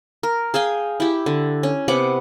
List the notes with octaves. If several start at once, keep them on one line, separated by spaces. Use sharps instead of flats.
A#4
G#4 F5 G5 G#5
E4 G4
D3
C#4
C3 B3 F#5 D6